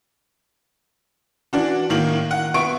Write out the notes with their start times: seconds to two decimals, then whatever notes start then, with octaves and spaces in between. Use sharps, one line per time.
1.53 E3 D4 F#4
1.90 A2 D#3 A#3 F#7
2.31 F#5
2.54 B3 E5 C#6 D7